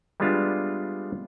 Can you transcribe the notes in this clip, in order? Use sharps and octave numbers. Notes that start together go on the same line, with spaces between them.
G3 G#3 B3 D4 F4 E5